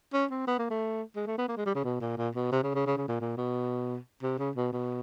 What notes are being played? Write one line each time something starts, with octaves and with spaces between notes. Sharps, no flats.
C#4
C4
B3
A#3
A3
G#3
A3
B3
A#3
G#3
G3
C#3
B2
A#2
A#2
B2
C3
C#3
C#3
C#3
C#3
A#2
A#2
B2
C3
C#3
B2
B2